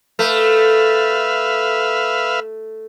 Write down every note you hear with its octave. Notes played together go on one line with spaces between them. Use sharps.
A3 B4 E5 F5